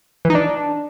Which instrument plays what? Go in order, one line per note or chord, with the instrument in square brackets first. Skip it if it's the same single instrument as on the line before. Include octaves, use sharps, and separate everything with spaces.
[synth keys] E3
D#4
D4